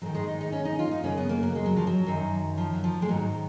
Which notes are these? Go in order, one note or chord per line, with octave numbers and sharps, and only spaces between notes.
G#2 D#3 F#3
G#3
D#4
D#4
C#4
D#4
F4
D#4
F#2 C#3 C#4
B3
A#3
F#3
G#3
F#3
F3
F#3
F#2 D#3
F3
F#3
F3
G#3
G#2 D#3 F#3